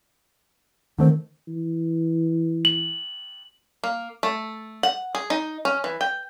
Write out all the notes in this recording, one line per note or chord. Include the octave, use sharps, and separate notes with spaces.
D3 D#3 A3 C4
E3
F#7
A#3
A3
F#5
G#4
D#4
C#4
E3
G5